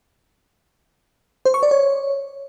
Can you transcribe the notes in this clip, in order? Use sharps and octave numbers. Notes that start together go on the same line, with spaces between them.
C5
C#6
D5
C#5